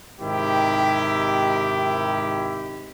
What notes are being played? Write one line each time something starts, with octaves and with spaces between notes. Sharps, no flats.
G#2 C3 D#3 E4 G4